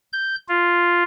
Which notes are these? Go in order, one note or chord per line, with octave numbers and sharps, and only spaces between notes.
G6
F4